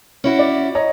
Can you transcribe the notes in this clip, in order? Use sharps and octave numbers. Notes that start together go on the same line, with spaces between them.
C#4 E4 F#4
D5
C#5 D#5 A#5